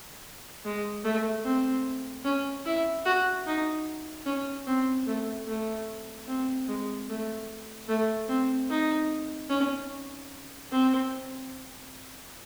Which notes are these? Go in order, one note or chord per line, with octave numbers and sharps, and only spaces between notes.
G#3
A3
C4
C#4
E4
F#4
D#4
C#4
C4
A3
A3
C4
G#3
A3
A3
C4
D#4
C#4
C4